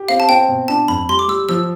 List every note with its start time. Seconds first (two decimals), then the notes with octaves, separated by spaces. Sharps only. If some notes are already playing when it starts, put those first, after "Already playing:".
Already playing: G4
0.08 C4 F5
0.20 A5
0.29 C4 G5
0.49 B2
0.68 D4 A5
0.88 F2 B5
1.09 G3 C6
1.19 D6
1.28 G3 E6
1.49 F3 E6